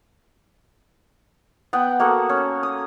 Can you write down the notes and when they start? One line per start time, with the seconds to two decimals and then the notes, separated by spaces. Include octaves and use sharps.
1.73 B3 F#5 G5
2.00 A#3 F#4 A4
2.29 C#4
2.63 D#6